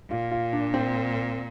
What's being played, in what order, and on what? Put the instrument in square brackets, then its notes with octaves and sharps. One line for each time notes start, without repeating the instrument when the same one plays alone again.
[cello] A#2 [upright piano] F4
[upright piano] F4
D4
C4